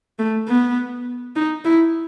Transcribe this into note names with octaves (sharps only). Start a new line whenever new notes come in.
A3
B3
D#4
E4